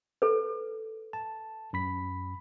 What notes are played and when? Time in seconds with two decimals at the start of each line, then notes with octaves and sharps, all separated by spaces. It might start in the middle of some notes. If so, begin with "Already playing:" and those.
0.22 A4 B4
1.13 A5
1.73 F#2 B5 B6